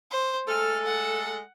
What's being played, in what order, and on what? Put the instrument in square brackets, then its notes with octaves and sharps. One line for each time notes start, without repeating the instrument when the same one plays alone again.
[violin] C5
[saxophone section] G#3 A3 A4 [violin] F6
[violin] F#5